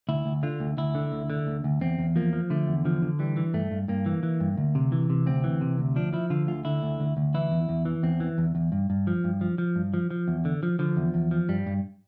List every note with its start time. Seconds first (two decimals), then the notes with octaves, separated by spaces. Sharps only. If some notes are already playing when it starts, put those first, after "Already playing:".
0.09 D2 E4
0.26 D2
0.43 D3 F4
0.60 D2
0.78 D2 E4
0.95 D3
1.12 D2
1.30 D3
1.47 D2
1.64 D2
1.81 E2 C4
1.99 E2
2.16 F3 A#3
2.33 F3
2.50 D3 A3
2.68 E2
2.85 D3 F3
3.02 D3
3.19 E3 G3
3.37 E3
3.54 G2 A3
3.71 G2
3.88 G2 A#3
4.06 E3
4.23 E3
4.40 G2
4.57 D2
4.75 C3
4.92 E3
5.10 C3
5.26 D2 C4
5.44 E3
5.61 C3
5.78 D2
5.96 F3 D4
6.13 F3 E4
6.30 D3 F4
6.48 D2 F4
6.65 D3 E4
6.83 D2
7.00 D2
7.17 D2
7.34 E3 E4
7.52 E2
7.69 E2
7.85 E3
8.03 E2 C4
8.20 E3
8.38 E2
8.55 E2
8.72 G2
8.90 G2
9.07 F3
9.24 G2
9.41 F3
9.58 F3
9.76 G2
9.94 F3
10.11 F3
10.28 E2
10.45 D3
10.63 F3
10.79 D3 F3
10.97 E2
11.14 E2
11.31 F3
11.49 G2 G3
11.67 G2